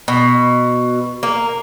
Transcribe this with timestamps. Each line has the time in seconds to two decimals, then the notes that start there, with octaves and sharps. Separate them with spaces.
0.08 B2
1.23 A#3